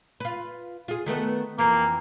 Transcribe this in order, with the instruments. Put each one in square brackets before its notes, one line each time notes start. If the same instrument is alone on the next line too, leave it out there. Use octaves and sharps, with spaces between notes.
[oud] F4 B4
F4 G#4
D#3 A3 B3
[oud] F2 E3 [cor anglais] A#3